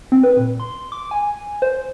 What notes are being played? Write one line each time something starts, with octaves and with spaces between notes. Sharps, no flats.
C4
B4
A#2
C6
D6
G#5
C5